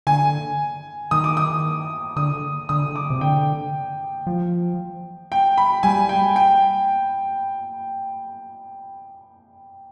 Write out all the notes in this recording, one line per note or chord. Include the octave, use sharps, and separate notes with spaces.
D3 G#5
D#3 D#6
D6
D#6
D3 D#6
D3 D#6
D6
C3
D3 G5
F3
G5
B5
G3 G#5
G5
G5